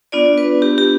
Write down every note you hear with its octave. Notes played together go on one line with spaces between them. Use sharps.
B3 D4 F4 D5
B4
G4
G4